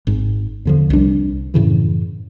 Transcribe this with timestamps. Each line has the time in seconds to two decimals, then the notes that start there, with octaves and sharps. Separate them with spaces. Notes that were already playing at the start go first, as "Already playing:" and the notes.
0.07 G#1 G#2
0.65 E2 D3 F3
0.90 C2 D4
1.54 F#2 A2 C#3 E3